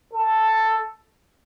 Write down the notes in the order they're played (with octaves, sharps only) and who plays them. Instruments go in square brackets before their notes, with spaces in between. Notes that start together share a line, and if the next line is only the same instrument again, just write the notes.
[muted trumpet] A4